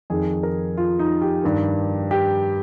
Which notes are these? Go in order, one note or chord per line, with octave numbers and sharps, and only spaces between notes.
F2 D#3 G#4
A#4
F4
D#4
G4
G2 D#3
G4